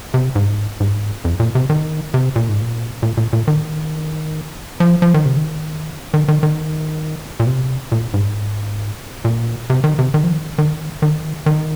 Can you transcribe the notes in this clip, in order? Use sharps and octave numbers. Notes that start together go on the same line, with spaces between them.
C3
G#2
G#2
F2
A#2
C3
D#3
C3
A#2
G#2
A#2
A#2
A#2
A#2
D#3
F3
F3
D#3
C3
D#3
D#3
D#3
D#3
A#2
C3
A#2
G#2
A#2
C3
D#3
C3
D#3
F3
D#3
D#3
D#3
D#3